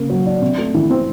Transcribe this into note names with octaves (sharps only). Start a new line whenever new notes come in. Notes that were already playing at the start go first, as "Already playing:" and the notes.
Already playing: C#3 A#3
F#3
D4
C3
A3
E3
C4